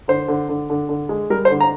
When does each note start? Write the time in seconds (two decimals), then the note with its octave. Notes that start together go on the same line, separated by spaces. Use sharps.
0.08 D3 C5
0.28 D3
0.49 D3
0.70 D3
0.89 D3
1.09 G#3
1.30 G3 A#4
1.45 C5
1.50 D3
1.61 A#5